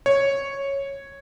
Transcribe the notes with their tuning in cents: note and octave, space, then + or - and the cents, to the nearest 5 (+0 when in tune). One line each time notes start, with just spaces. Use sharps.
C#5 -5